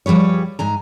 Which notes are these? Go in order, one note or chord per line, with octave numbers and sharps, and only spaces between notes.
F3 G3 G#4 B4 C#5
G#2 G#5 A#5